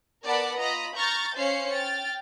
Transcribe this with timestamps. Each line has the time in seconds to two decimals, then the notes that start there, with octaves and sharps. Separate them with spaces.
0.24 B3 A#4 D5 F#5 A5 B5
0.59 F4 D#5 A#5 B5
0.96 A#5 C#6 F6 G6 A6 A#6
1.35 C#4 C5 F5 C7 C#7
1.72 G5 F6 A6